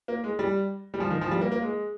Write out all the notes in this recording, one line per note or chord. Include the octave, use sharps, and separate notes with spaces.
A#3
G#3
G3
G3
F3
D#3
F3
G3
A#3
A#3
G#3